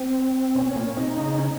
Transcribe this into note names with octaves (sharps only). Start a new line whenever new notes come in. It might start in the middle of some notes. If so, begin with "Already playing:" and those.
Already playing: C4
B2 C#4
A#2
C3 D#4
C#3
C#4